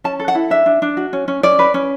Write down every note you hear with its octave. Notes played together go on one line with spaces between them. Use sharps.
C#4 A5
A4
F#5
E4
D4 E5
D4
D4
F#4
C#4
C#4
C#4 D5
B4
C#4